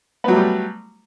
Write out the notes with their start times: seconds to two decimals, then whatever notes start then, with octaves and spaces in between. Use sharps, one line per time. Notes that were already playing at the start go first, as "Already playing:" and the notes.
0.24 B3
0.28 F#3
0.32 A3
0.36 G3